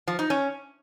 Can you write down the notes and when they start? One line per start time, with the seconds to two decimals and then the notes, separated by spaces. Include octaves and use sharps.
0.07 F3
0.19 D#4
0.30 C#4